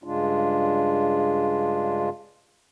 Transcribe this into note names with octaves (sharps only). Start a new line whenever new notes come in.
G2 C#3 G#3 D4 F4